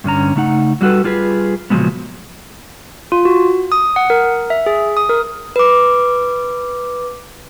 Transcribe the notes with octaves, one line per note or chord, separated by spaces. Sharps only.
G2 D3 C#4 A#5
C#3 A3 D#4 F#5
F#3 G3 F#4 A4 B4
G3 F4 G#4 B4
A#2 C#3 F3 F#3 G#3 B3
F4
F#4
D#6
F#5
A#4
E5
G#4
D#6
A#4
B4 D6